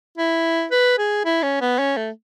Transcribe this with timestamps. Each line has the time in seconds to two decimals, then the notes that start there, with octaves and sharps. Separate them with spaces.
0.18 E4
0.71 B4
0.98 G#4
1.25 E4
1.43 C#4
1.61 B3
1.79 C#4
1.97 A3